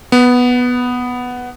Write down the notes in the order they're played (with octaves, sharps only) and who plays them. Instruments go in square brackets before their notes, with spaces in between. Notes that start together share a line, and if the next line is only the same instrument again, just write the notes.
[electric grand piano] B3